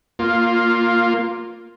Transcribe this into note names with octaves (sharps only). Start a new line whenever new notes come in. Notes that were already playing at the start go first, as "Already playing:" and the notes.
A#3 F4